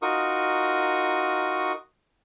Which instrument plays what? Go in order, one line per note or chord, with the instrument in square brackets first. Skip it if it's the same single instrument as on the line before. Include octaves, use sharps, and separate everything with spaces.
[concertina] D#4 F4 F#4 A#4 C#6 D#6